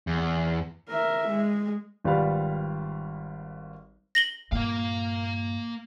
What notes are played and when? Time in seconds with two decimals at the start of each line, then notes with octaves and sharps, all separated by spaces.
0.07 E2
0.89 A#4 E5
1.29 G#3
2.04 G#1 G3 F4 B4 F5 B5
4.15 A#6 F#7 G7
4.52 G2 A#2 A#3 F5